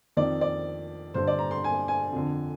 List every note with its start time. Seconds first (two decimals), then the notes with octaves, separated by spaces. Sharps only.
0.17 F2 D#3 D5
0.41 D5
1.14 G2 D3 C5
1.27 D5
1.39 A#5
1.51 C6
1.64 G#5
1.88 G#5
2.13 F2 D3